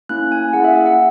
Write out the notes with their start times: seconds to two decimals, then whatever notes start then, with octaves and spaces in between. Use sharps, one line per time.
0.09 A#3 C#4 E4 F#6
0.32 G#5
0.53 A#3 E4 G#4 F#5
0.64 E5
0.75 E5
0.86 F#5